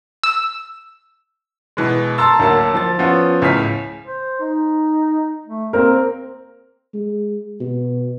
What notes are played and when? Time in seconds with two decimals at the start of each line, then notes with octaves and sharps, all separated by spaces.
0.24 E6
1.77 B2 E3 G#3
2.18 A5 A#5 C6 E6 A6
2.39 D2 F#3 A#3 A5
2.74 F3 A6
2.99 F3 B3 C#4 F4
3.42 C#2 A2 G#5 F6 B6
4.06 C5
4.41 D#4
5.46 A3
5.73 A#3 C4 A#4
6.94 G#3
7.60 B2